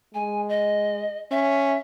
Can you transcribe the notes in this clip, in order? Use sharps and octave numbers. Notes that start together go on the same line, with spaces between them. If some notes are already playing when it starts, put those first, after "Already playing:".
G#3 G#5
D#5
C#4 E5